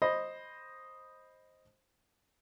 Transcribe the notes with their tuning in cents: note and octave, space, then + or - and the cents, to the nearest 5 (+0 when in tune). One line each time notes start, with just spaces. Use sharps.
C5 +10 D#5 +0 B5 +0